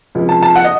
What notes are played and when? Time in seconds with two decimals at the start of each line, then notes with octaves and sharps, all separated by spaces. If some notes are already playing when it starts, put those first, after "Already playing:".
0.15 C#2 C3 F3
0.29 A5
0.42 A5
0.56 F#5
0.64 D#5